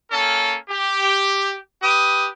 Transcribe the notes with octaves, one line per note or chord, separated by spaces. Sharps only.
A#3 C#4 A4
G4
G4 B4 D#6